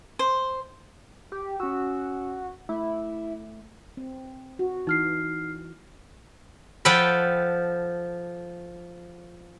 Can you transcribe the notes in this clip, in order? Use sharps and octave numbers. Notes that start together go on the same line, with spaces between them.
C5
G4
C#4 F#4 E6
A3 E4
C4
F#4
E3 D#4 F6 C7
F3 A4 F#5 G5 B5